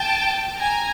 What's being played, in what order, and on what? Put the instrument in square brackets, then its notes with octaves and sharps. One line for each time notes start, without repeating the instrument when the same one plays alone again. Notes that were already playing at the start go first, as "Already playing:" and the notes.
Already playing: [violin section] G5 A5
G#5 A#5